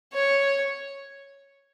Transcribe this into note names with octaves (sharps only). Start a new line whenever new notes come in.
C#5